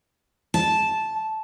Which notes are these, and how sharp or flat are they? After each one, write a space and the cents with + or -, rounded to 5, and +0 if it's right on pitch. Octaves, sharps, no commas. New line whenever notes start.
A5 -10